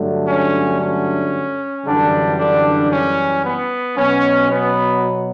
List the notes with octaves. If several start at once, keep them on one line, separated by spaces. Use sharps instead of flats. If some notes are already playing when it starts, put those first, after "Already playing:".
Already playing: G2 D3 F#3 A3
C#4
C#4
F#2 D3 E3 G3 D4
D3 D4
C#4
B3
B2 F#3 B3 C#4
B3